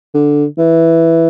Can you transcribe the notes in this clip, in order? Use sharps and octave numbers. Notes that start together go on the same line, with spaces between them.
D3
E3